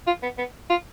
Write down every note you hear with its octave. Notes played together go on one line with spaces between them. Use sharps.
F4
B3
B3
F4